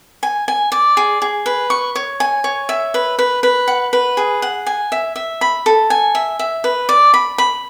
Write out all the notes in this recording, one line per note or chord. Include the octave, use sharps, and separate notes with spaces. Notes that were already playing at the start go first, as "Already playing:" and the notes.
G#5
G#5
D5
G#4
G#4
B4
C#6
C#5
G#5
C#5
E5
B4
B4
B4
F#5
B4
G#4
F#5
G#5
E5
E5
B5
A4
G#5
E5
E5
B4
D5
B5
B5